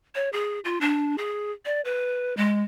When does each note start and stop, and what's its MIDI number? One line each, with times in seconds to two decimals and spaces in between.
0.15 0.29 73
0.33 0.60 68
0.65 0.80 65
0.81 1.16 62
1.18 1.51 68
1.65 1.81 74
1.85 2.34 71
2.37 2.63 56